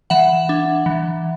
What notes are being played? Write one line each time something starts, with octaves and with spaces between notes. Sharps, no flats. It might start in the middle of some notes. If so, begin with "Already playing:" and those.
E3 E5 F#5
D4
E3